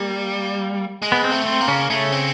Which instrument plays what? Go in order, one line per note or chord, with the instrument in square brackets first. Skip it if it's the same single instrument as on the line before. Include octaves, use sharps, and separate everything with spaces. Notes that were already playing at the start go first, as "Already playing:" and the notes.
Already playing: [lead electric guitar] G3 [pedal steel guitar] A#3
[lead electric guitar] G#3
[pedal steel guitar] B3
C4
[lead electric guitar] A3
[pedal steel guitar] C4
[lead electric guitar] A#3
[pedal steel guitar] C#3 C#4
[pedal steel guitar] C#3 C#4 [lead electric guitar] A3
[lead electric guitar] C4